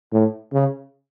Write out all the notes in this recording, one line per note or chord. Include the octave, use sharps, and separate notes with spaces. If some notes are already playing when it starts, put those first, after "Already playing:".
A2
C#3